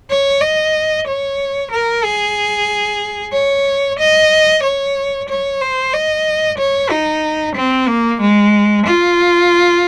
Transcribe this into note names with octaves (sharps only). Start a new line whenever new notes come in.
C#5
D#5
C#5
A#4
G#4
C#5
D#5
C#5
C#5
C5
D#5
C#5
D#4
C4
A#3
G#3
F4